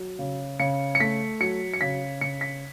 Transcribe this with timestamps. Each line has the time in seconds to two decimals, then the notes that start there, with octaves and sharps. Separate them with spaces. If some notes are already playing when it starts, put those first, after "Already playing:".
Already playing: F#3
0.19 C#3
0.59 C#3 C#7
0.95 C#7
1.00 A3 B6
1.40 F#3 C#7
1.74 C#7
1.81 C#3 B6
2.21 C#3 C#7
2.41 B6